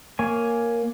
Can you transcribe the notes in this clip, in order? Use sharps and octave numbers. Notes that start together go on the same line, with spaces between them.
A#3 C#5 G#5